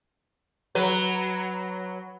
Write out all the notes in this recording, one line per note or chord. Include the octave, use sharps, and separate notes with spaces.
F#3 B4